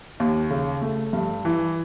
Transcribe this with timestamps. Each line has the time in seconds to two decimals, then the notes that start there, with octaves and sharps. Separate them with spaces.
0.20 D#2
0.50 C#3
0.82 A3
1.13 G2
1.45 E3